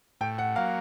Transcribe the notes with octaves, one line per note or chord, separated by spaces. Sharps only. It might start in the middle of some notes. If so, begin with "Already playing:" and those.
A2 G5
F#5
F#3 A#3 F5